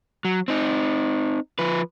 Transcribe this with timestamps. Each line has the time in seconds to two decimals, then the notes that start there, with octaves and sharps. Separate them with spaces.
0.25 F#3
0.48 C4 D#4
1.59 F3 B4